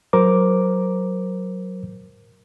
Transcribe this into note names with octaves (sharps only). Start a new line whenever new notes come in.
F#3 A#4 C5 D6